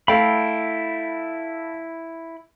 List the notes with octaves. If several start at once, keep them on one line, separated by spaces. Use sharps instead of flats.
A3 E4 F5 G5 B5